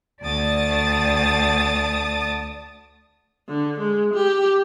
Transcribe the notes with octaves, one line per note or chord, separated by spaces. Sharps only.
D2 D5 A5 D#6 A6
D3
G#3
G4